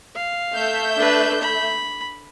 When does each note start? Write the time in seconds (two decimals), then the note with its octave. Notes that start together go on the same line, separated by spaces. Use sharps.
0.15 F5
0.53 A3 E5 G6
0.96 D4 B4
1.42 B5